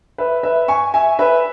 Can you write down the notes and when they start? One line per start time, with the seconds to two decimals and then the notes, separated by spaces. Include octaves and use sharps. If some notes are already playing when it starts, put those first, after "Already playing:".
0.18 B4 E5
0.43 B4 E5
0.68 G#5 C#6
0.94 E5 G#5
1.19 B4 E5